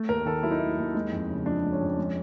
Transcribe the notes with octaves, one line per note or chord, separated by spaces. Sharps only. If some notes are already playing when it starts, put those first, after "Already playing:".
Already playing: A3
D#2 A#4
D#3 A4
F#3 E4
D#4
A3 E4
D#2
G#3 D#4
F2
C#3
F3 D4
G#3
C#4
F2
G#3